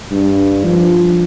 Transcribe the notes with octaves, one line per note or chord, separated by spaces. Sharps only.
G2
F3